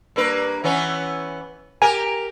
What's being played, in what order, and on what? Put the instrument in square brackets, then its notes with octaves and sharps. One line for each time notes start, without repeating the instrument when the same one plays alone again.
[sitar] G2 A#3 B4
E3 B3 C#4
[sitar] G4 A#4 [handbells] G#5